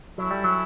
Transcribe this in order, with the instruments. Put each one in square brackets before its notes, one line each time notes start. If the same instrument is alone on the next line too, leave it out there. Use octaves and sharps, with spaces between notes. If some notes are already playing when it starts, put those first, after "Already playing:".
[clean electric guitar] F#3 [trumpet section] C#4 E4 A4
[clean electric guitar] G3
F#3